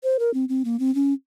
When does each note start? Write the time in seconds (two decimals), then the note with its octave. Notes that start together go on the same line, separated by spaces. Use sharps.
0.03 C5
0.19 A#4
0.34 C4
0.49 C4
0.65 A#3
0.79 C4
0.95 C#4